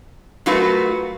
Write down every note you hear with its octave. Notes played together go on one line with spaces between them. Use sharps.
F#3 A3 F4 F#4 A#4 B4